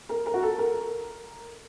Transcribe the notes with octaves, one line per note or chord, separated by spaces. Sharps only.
A#4
A#4
F#4
A4
A#4